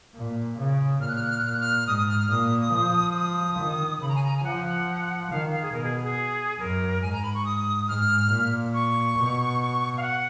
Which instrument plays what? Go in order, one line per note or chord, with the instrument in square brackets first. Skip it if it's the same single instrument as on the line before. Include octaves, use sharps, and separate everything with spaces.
[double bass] A#2
C#3
[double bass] A#2 [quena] F6
[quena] F#6
F6
F#6
F6
F#6
[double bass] A#2 [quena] F6
[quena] F#6
F6
[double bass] G#2 [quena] D#6
[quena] D#6
F6
F6
[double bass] A#2 [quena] D#6
[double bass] F3
[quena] D#6
[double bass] D#3
[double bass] C#3 [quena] B5
[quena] A#5
G#5
A#5
G#5
[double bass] F3 [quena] F#5
[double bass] D#3 [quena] F5
[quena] F5
G#4
[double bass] B2 [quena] A#4
[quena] G#4
G#4
[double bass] F#2 [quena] A#4
[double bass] G#2 [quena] G#5
[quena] A#5
B5
C#6
D#6
[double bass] G#2 [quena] F6
[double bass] A#2
[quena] C#6
[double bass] B2
[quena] F5
F#5